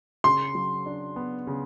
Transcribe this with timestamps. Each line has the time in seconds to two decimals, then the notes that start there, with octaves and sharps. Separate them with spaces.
0.24 C#3 C6
0.55 F#3
0.86 D4
1.16 B3
1.47 C#3